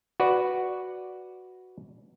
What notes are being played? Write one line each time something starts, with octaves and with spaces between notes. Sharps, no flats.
F#4 B4 D5